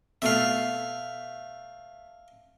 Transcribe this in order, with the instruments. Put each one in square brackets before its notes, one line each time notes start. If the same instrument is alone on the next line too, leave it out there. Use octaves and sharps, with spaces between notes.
[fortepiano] B2 A3 [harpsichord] E5 F5